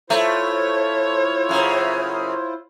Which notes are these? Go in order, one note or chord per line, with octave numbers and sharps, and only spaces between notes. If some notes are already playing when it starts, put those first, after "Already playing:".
A3 E4 F4 C5 C#5
F#2 C#3